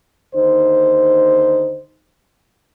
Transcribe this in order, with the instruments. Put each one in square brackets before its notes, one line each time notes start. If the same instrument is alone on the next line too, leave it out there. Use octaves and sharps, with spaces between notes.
[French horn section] D#2 D3 D#4 C5